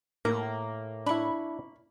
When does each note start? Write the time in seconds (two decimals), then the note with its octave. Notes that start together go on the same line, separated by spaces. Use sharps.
0.25 A2 A#3 A#5
1.07 D4 E4 B5 C#6